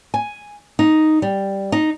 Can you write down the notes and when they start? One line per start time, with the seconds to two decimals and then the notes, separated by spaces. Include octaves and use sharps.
0.14 G#5
0.79 D#4
1.22 G3
1.72 D#4